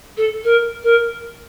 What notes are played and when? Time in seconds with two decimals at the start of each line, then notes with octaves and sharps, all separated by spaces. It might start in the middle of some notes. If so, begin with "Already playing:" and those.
0.17 A4
0.44 A#4
0.83 A#4